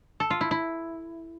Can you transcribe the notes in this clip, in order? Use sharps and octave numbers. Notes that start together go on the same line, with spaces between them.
A4
F4
E4
E4